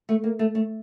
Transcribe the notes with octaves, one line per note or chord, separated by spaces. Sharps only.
A3
A#3
A3
A3